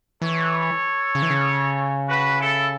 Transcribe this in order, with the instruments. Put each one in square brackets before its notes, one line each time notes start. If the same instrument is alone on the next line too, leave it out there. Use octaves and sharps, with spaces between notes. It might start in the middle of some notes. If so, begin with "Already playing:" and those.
[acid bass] E3 [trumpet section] A4 C#5
[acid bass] C#3
E3
C#3
[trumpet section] F#4 B4
E4 A4